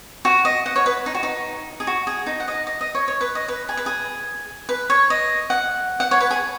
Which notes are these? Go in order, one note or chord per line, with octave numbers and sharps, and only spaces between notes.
F#4
D#5
F#5
C#5
B4
D#4
F#4
D#4
G#4
F#4
G#4
D#4
F#5
D#5
D#5
D#5
C#5
C#5
B4
D#5
B4
G#4
B4
G#4
B4
C#5
D#5
F#5
F#5
C#5
B4
G#4